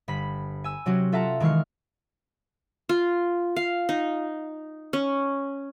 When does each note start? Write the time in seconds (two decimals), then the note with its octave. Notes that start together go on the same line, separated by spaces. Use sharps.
0.08 G1 B5 B6
0.64 G#5 E6
0.86 C3 F#3 C#4 F#4 G4
1.12 F4 A4 E5 F#5 A5 A#5
1.40 D#3 E3 G#3 C#6 F6 C7
2.89 F4
3.56 F5
3.89 D#4
4.93 C#4